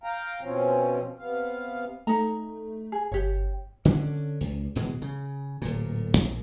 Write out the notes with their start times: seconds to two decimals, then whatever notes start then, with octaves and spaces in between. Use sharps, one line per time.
0.04 F5 G5 A#5
0.41 B2 F3 C4 C#4
1.19 C3 B3 F5
2.07 A3 D#4 A#5
2.92 G#4
3.12 G1 G4 C#5
3.85 D3 C#4 D4
4.41 C#2
4.75 D1 B2 E3 G#3
5.02 C#3
5.62 D1 A#2
6.17 A#1